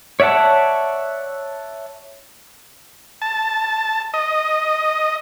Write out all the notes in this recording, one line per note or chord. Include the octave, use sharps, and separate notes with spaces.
C#5 D5 E5 F#5 A5
A5
D#5